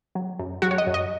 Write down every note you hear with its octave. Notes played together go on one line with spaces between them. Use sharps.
F#3
F#2
F#3 F#4
C#5
D#5
F#2
D#5